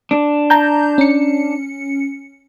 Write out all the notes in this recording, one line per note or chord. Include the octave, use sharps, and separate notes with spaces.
D4
A5 A#5 G6
C#4 C#7